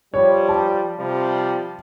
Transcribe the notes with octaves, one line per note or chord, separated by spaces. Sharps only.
F3 G3 C#5
A5
C3 F3 G3